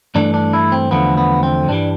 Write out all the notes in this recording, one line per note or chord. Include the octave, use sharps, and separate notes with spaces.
G2 E3 A3 D4
D4
E4
C4
E2 D3 F3 A3 B3
B3
C4
G2 E3 G3 D4